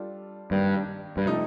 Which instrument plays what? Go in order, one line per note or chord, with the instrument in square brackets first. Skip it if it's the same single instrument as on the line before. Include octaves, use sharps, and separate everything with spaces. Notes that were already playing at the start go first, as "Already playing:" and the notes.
Already playing: [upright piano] G3 D4 F4 A4
[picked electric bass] G2 [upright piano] D#3 G3 A#3 D4
[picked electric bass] G2
[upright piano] C3 F3 A3 D#4